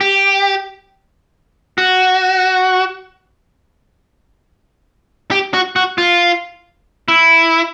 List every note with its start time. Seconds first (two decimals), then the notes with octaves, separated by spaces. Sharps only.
0.01 G4
1.78 F#4
5.31 G4
5.54 F#4
5.76 F#4
5.98 F4
7.08 E4